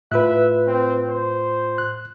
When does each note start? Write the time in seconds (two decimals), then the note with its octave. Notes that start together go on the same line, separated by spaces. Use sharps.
0.12 A2 F4 B4 E5 F#6
0.68 C4
1.09 C5
1.78 F#6